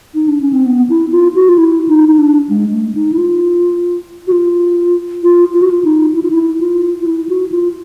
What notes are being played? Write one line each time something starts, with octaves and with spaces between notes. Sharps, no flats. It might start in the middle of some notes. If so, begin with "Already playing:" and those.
D#4
D4
C#4
C4
B3
E4
F4
F#4
F4
E4
D#4
D#4
D4
G#3
A3
D#4
E4
F4
F#4
F4
F4
F4
F#4
F4
D#4
E4
F4
E4
F4
F4
E4
F#4
F4